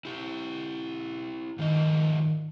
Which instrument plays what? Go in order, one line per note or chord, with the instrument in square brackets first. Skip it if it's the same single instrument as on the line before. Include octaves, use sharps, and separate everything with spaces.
[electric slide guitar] E4 G4
[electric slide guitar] G#2 F3 D#5 [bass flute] D#3